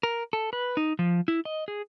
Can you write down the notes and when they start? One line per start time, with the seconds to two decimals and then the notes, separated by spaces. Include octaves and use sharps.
0.03 A#4
0.33 A4
0.53 B4
0.77 D#4
0.99 F3
1.28 E4
1.45 D#5
1.68 G#4